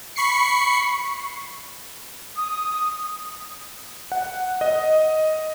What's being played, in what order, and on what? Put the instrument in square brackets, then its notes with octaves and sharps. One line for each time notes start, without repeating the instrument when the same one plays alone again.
[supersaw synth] B5 C#6 C7 C#7
[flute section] D#6
[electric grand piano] F#5
D#5